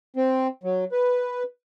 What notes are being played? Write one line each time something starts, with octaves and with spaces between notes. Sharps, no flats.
C4
F#3
B4